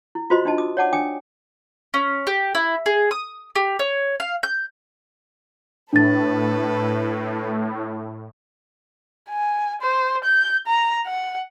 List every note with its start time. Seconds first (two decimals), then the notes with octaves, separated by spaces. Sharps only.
0.15 E4
0.30 F4 F#4 C5 D#5 B5 C6
0.45 D4 D#4 D#5 A5
0.58 D6 D#6
0.77 C#5 D5 F#5 A5 D6
0.93 D4 G5 G#5 D6 D#6
1.94 C#4
2.27 G4
2.55 E4
2.86 G#4
3.11 D#6
3.55 G4
3.79 C#5
4.20 F5
4.43 G6
5.93 A2 D4 A4 B4 A6
9.30 G#5
9.81 C5
10.24 G6
10.67 A#5
11.06 F#5